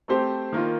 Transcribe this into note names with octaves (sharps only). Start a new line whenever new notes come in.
A3 C4 G4 C5
D#3 A#3 F4